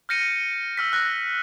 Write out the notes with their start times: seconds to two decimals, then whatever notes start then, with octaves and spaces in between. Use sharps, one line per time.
0.09 F6 G6 A#6 C#7 D#7
0.77 E6 F6 B6
0.92 E6 F#6 A#6